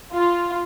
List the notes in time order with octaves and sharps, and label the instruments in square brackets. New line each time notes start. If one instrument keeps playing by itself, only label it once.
[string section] F4